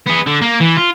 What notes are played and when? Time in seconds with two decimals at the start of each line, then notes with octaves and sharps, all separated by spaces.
0.06 B3 G#4
0.26 D3
0.42 A#3
0.60 E3
0.77 F4